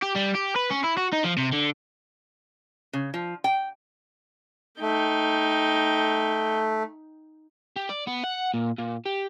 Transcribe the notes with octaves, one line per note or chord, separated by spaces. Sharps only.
G4
G3
G4
B4
C#4
E4
F#4
D#4
F3
C3
D3
C#3
F3
G5
A3 D#4 G5
G4
D5
B3
F#5
A#2
A#2
G4